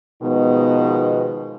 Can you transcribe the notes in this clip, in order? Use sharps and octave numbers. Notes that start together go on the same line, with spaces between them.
B2 D#3 F3 G#3 B3 D#4